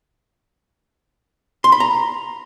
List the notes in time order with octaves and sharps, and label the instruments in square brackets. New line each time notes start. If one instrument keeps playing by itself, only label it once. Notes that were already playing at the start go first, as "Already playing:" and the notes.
[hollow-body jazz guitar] C6
B5
A#5